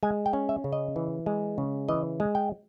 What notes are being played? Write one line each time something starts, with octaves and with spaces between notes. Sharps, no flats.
G#3 G#5
G5
C#4
E5
C#3
D#5
E3
G#3
C#3
E3 D#5
G#3
G5